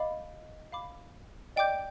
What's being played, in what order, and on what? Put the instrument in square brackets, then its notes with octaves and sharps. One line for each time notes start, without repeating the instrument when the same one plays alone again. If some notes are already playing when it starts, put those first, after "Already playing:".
Already playing: [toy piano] D#5 [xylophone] F5 B5 D6
[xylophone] F5 B5 D6
[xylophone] D5 G5 D6 G6 [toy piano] D#5